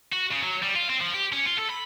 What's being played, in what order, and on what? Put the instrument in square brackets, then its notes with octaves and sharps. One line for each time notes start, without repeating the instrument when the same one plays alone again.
[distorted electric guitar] F#4
C#3
F#3
G3
F4
C4
F3
G4
C#4
F4
A4
B5